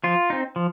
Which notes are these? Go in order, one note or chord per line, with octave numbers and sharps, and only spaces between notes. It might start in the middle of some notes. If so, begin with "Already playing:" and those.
F3 F4
C4 D#4
F3